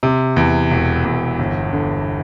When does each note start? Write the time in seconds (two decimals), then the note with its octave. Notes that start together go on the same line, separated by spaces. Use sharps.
0.03 C3
0.37 E2
0.71 E1
1.05 E2
1.39 G1
1.73 D3